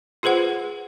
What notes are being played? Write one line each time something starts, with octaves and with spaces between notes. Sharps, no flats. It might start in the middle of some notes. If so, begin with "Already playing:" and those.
F4 G#4 B4 C5 F#5